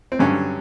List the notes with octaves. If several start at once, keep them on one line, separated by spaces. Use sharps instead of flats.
C4
G2 D3 F#3 C#4